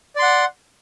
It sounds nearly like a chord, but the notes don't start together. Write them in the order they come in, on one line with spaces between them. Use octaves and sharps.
D5 C6 F#5